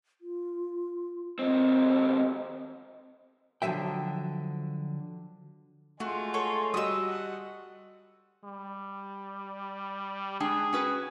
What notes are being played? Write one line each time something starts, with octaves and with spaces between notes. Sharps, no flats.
F4
D#2 C4 D#5
D3 F3 F#3 E5 G5
G#3 A3 F4 F#4
A4 C#5
G3 F#4 D#5 D#6 E6
F#5
G3
G#3 D4 G#4 G5
C#4 F#4 B4